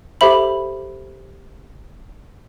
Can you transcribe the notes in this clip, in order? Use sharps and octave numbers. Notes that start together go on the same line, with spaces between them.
G4 A4 C5 E5 B5 F#7